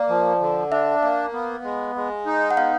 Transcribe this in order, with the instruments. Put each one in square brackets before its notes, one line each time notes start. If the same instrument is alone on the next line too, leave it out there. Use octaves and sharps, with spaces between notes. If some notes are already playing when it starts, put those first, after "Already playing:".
Already playing: [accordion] A#3 [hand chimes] D5
[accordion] F3
D3
[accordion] D4 [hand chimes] E5
[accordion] A#3 [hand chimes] F5
[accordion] B3
G#3
G#3
D#4
[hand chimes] F#5
[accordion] B3 [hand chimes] F5